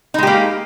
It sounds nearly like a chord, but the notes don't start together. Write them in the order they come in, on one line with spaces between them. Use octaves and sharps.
D#4 G#3 G4 A#3